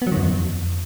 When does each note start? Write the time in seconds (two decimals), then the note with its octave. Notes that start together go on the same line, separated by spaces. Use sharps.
0.02 B3
0.07 F#3
0.12 D#3
0.17 F#2
0.22 F2